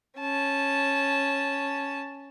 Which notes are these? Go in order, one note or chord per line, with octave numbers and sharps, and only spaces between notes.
C#4 A5